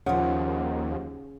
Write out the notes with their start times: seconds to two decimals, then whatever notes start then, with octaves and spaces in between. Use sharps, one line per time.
0.06 D#2 C#3 F3 F#5